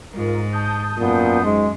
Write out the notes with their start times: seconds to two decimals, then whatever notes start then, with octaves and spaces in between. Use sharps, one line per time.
0.13 G#2 F4 A#4
0.53 A5 D#6 G6
0.98 F#2 A#2 B3
1.44 G#2 G#3